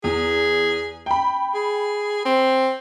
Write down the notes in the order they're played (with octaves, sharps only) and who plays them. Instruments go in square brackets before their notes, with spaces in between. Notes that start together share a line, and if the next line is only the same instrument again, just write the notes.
[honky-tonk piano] E2 [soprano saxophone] G#4
[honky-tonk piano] G5 B5
[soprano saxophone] G#4
C4